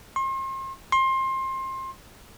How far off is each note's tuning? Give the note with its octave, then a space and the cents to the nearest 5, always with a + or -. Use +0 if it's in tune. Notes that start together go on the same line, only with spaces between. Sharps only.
C6 +40
C6 +25